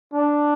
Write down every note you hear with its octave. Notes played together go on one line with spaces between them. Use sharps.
D4